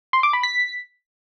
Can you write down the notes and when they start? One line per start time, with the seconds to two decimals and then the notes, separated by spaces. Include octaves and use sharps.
0.13 C6
0.23 D6
0.33 B5
0.43 B6